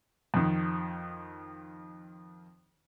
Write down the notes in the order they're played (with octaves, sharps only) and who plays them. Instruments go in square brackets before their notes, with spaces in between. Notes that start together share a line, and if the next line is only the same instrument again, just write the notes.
[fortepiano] F2 D#3